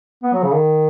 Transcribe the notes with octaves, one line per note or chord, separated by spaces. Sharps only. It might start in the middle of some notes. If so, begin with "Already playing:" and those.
B3
F#3
C#3
D#3